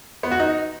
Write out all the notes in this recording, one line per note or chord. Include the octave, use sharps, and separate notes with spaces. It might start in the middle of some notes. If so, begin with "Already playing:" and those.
B3
F#4
D#4